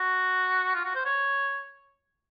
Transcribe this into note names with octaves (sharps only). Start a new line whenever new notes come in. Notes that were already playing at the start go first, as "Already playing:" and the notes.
Already playing: F#4
F4
F#4
C5
C#5